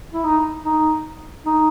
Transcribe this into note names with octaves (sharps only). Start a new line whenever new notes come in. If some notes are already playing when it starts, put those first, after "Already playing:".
E4
D#4
D#4
D#4